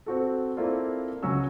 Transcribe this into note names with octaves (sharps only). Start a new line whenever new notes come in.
C4 F#4 A4
A#3 C4 E4 F4 A4 D5
C#2 C#3 F#3 C#4 F#4 E6